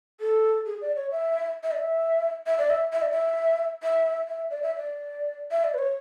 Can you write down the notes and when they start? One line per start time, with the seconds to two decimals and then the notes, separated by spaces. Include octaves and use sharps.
0.21 A4
0.66 G#4
0.81 D5
0.96 C#5
1.11 E5
1.63 E5
1.72 D5
1.79 E5
2.46 E5
2.59 D5
2.70 E5
2.93 E5
3.02 D5
3.11 E5
3.83 E5
4.28 E5
4.51 D5
4.63 E5
4.76 D5
5.51 E5
5.64 D5
5.74 B4
5.78 C#5